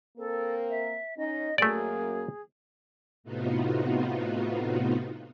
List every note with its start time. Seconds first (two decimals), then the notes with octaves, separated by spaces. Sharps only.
0.18 A#3 C4 A4 A#4
0.70 E5
1.18 C#4 D#4 D#5
1.58 F#2 A3 A#3 G#4 D5
3.24 A2 C3 B3 D#4 F4 F#4